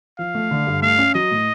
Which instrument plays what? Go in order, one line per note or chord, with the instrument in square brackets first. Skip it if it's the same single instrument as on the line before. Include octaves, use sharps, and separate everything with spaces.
[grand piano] F3 [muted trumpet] F5
[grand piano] A3
D3
G2
[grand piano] A3 [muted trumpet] F5
[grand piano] C#4
[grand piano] F#3 [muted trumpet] D#5
[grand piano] A2